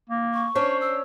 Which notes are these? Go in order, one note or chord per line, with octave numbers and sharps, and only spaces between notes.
A#3
C#6
C#4 D4 C5 C#5
E6